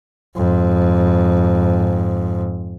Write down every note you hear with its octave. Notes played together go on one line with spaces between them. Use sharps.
F2 G#2